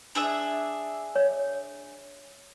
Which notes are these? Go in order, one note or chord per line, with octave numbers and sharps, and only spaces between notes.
D4 G#4 E5
C#5